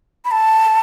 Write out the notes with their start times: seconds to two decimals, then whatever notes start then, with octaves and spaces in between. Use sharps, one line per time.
0.25 B5
0.31 A5